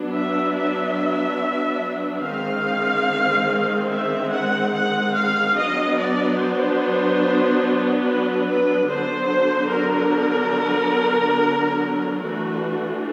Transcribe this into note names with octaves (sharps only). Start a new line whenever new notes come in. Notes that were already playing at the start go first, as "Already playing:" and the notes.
Already playing: F#3 B3 D4
E5
E5
D#3 G#3 C4 F5
E5
F#5
F#5
F5
F#3 B3 D4 D#5
D5
C5
B4
B4
D3 F#3 B3 D4 C5
A#4
E3 A3 D4 F#4